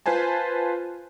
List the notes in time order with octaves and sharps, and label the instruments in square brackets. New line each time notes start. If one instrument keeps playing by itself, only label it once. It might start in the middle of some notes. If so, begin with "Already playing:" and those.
[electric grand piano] F4 B4 C5 G#5 A5